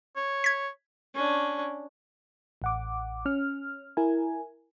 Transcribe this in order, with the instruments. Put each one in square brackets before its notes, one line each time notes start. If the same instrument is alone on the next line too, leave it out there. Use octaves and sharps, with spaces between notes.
[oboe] C#5
[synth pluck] G#6 B6
[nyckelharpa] C#4 D4
[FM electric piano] A1 F#5 D6
C#4 F6
E4 A#4 G#5